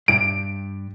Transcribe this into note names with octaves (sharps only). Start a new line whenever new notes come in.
G2 D7